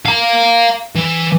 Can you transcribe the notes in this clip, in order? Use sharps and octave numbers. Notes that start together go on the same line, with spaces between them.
F5 A#5
E3